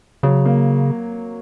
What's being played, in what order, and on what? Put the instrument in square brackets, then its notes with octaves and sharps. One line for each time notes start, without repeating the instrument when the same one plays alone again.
[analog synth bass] C#3 [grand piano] F#3
[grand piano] A#3